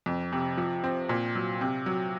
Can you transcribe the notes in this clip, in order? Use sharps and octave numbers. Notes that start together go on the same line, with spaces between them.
F2
C3
F3
C4
A#2
F#3
C3
F#3